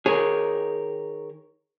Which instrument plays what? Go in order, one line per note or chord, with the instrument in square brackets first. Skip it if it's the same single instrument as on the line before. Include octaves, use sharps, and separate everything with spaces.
[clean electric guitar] D#3 A#4 C#5 [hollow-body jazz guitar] G#4